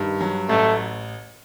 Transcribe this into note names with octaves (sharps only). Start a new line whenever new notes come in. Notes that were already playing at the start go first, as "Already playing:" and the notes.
Already playing: G2 D#3
F#3
A1 A3